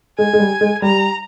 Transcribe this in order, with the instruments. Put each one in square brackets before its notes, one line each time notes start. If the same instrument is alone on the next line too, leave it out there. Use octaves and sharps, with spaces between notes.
[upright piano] G#3 [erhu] G#5
[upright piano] G#3
G3
G#3
[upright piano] G3 [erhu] A#5